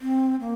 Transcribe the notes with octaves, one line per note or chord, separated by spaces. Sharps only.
C4
A#3